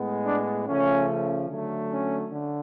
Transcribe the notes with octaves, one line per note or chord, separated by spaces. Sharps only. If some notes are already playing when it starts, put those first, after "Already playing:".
Already playing: A2 G#3 B3
D4
C#3 F3 A3 C#4
D3 F#3 A3
C#4
D3